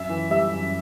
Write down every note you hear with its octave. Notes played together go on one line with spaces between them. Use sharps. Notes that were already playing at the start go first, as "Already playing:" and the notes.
Already playing: F#2 E5
E3
G3 E5
F#2